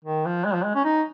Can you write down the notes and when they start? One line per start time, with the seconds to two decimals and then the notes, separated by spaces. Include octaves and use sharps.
0.05 D#3
0.25 F3
0.45 G#3
0.54 F3
0.64 G#3
0.75 C#4
0.84 D#4